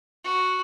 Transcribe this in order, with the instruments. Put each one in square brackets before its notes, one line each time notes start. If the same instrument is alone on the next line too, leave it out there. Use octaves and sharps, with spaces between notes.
[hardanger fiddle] F#4